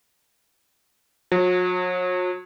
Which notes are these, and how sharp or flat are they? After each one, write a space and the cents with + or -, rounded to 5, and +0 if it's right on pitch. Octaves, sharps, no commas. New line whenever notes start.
F#3 -40